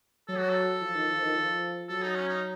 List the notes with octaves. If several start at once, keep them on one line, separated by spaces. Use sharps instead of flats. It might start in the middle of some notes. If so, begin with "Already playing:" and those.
F#3 A4
F#4
A4
F3
D#3
F3
D#3
F3
F#3 A4
D#4
C#4
D#4